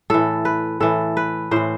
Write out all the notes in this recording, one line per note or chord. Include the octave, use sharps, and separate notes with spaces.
A2 E3 A4
B4
A2 E3 A4
B4
A2 E3 C5